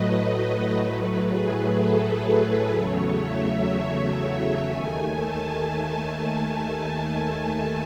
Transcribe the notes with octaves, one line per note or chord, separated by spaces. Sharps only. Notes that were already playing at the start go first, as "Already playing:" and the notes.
Already playing: A2 F#3 A3 B4 D#5
B4
A2 F#3 A3
G#4
A4
B4
E2 C#3 F#3 A3 C#5
E5
E5
D#2 D#3 A3 G#5
A5